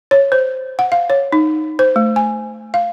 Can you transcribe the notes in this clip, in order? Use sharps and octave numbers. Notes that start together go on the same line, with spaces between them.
C#5
C5
F#5
F5
C#5
D#4
C5
A3
G#5
F5